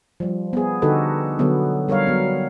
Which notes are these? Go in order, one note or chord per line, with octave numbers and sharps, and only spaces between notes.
F3 G3
B3 G#4
D3 D#4 F#4 G4 A4 B4
D3 F#3 B3
G3 A#4 C#5 F5
F#3 B3